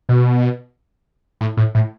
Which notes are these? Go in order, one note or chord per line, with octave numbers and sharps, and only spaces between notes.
B2
A2
A2
A2